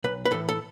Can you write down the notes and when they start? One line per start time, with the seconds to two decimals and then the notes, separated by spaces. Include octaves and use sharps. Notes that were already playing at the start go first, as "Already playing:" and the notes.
0.04 B1 B4
0.25 B4
0.31 A2 E3 A4
0.49 A4